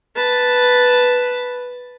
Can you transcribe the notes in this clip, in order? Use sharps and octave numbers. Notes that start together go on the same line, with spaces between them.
B4 A5